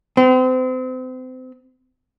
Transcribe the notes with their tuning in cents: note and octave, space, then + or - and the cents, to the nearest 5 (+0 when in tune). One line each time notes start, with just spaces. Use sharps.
C4 -35